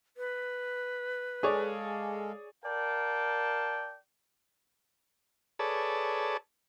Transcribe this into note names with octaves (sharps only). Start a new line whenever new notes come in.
B4
G#3 G#4 A4 C#5 D5 F5
A#4 D5 F5 G5 A5
G#4 A4 B4 C#5 D5 A5